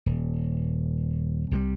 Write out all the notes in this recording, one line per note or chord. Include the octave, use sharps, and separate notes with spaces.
D#1
C2 C3 D#3 G3